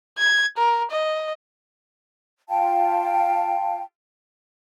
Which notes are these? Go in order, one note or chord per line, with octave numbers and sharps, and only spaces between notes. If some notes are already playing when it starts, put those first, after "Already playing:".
G#6
A#4
D#5
F4 F5 G5 A5